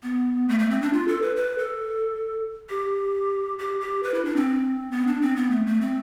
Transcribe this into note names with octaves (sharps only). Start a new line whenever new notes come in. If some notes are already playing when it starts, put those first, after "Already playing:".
B3
A3
A3
C4
D4
F4
A4
B4
B4
A4
G4
G4
G4
B4
E4
D4
C4
B3
D4
C4
B3
A3
A3
C4